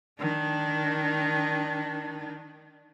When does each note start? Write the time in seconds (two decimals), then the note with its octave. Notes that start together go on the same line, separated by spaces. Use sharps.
0.20 D#3 D4